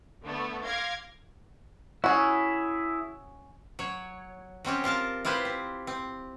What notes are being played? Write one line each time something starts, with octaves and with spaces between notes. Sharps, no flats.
D3 A3 B3
F5 C6 D6 G#6 A#6 C7
C#4 E4 F#4 G#4
F#3 C#5
F#3 C4 C#4 G4
C4 F4 A#4 A5
E4 F4 G4 B4 C5
C4
C4